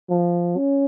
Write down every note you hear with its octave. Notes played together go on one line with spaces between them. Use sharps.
F3
C#4